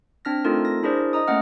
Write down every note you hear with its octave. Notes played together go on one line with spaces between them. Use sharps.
C4 D4 F6 A#6
A3 C4 D#4 F4 A4 A#4
A#6
D4 E4 G#4 A#4 C5 D5
D#5 A#5 D#6
A3 A#3 C#4 D#5 F#5 F6